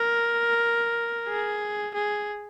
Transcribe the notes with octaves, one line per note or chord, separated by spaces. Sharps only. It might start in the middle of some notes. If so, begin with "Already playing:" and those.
Already playing: A#4
G#4
G#4